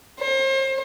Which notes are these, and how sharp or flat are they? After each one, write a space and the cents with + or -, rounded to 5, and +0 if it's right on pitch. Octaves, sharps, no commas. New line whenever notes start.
C5 +35